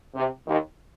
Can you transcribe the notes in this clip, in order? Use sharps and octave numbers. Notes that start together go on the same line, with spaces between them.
C3
D#2 D#3